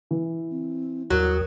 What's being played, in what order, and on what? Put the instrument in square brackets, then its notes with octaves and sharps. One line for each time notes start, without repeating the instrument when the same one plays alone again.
[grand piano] E3
[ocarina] C4
[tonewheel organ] D#2 [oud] F#3 [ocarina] A#4